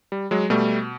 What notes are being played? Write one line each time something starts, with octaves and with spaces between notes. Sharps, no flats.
G3
F#3 G#3
B2 G3 A3